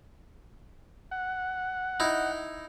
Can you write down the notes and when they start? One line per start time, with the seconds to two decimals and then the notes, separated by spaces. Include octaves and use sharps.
1.11 F#5
2.00 D#4 E4